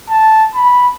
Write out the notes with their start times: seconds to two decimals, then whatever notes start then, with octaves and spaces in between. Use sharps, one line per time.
0.10 A5
0.55 B5